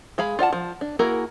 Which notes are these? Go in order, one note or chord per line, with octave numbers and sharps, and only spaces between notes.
G#3 G#4 F5 B5
F4 D5 F#5 A5
F3
D4
A#3 E4 F#4 G#4 A#4